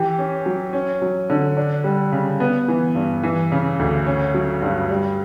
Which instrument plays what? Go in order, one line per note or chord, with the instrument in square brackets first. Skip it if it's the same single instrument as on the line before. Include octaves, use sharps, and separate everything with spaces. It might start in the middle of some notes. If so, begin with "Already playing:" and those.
Already playing: [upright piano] E3 G4
C#4
F#3
C#4
F#3
D3
D4
G3
C#3
B3
E3
G2
E3
C#3
D2
C#4
F#3
G2
G3